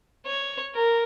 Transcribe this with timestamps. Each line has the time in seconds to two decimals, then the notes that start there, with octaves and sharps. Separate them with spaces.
0.26 C#5
0.75 A#4